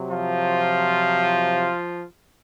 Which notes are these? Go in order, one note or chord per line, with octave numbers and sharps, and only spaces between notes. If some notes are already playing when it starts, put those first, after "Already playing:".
Already playing: C3 F#3
F3 F4